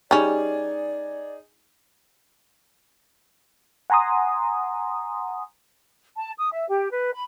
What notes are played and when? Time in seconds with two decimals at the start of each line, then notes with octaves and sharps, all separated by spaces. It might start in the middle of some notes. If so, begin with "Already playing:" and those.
0.11 G3 C#4 D#4 G#4 D5
3.90 F#5 G#5 A#5 C6 D#6
6.17 A5
6.38 D#6
6.51 E5
6.69 G4
6.91 B4
7.13 B5